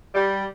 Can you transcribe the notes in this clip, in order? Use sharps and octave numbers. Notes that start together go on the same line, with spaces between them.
G3